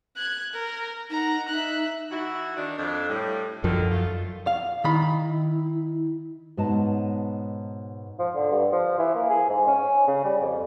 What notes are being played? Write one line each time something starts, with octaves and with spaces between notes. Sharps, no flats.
F#6 G#6
A#4
D#4 F#5 A#5
D#4 E5 F#6
E3 E4 F#4
D#3 D4
F2 D4
A2 G3
F#2 D3 D#3 F3
A3 F4
F5
D#3 E4 B5
G#2 B2 B4 C#5 D#5 A5
F3
D3
G2
F3
E3
A#3
G#4
G#2
C#4
C#3
G3
F2